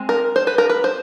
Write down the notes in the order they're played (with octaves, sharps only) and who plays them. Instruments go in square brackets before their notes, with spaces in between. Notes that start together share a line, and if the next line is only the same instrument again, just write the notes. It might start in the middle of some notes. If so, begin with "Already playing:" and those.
Already playing: [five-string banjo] G#3 C4
A#4
C5
B4
A#4
B4
C5